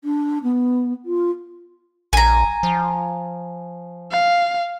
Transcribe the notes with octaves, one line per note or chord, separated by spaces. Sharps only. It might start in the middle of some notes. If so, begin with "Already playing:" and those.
D4
B3
F4
A#1 G#5 A#5
F3
F5